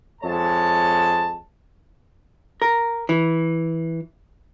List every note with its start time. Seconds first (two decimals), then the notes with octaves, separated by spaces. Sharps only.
0.22 F2 G#3 C#5 A5
2.62 A#4
3.09 E3